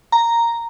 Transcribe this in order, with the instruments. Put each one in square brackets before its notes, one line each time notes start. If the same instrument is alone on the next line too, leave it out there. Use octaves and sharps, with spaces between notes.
[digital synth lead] A#5